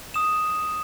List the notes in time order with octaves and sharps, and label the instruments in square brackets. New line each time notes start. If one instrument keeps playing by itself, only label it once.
[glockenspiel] D#6 E7